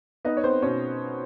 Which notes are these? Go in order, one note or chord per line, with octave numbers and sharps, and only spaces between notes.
B3 D#4 D#5
C#5
B3 C4 C5
B2 C#4 C#5